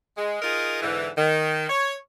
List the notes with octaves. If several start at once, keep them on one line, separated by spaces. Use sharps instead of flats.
G#3
D#4 F4 G#4 A#4
G#2 D3 E3
D#3
C#5